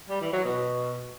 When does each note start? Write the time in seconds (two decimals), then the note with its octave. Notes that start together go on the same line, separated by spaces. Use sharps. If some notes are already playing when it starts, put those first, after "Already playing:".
0.09 G3
0.21 E3
0.33 F#3
0.44 B2